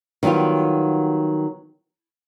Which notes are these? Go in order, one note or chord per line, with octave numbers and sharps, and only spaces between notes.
D#3 F#3 G3 B3 F4